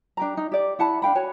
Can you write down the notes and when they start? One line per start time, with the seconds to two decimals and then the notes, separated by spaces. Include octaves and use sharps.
0.17 D4 G4 A#5
0.37 D#4
0.52 G4 D5
0.79 E4 F#5 A5 B5
1.02 D4 F5 G5 B5
1.15 F#4 C#5 G#5